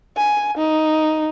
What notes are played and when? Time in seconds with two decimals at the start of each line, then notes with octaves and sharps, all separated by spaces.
0.16 G#5
0.57 D#4